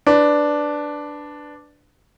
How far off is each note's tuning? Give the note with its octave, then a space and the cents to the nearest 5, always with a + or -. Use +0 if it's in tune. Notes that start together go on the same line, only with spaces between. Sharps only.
D4 +0 B4 +10